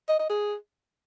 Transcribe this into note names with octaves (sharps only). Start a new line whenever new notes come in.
D#5
D#5
G#4